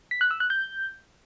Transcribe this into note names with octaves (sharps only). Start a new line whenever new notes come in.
B6
F#6
E6
F#6
G6